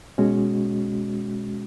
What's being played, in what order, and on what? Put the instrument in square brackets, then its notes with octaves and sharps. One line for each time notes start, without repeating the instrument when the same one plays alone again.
[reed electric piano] B2 G#3 C#4 F#4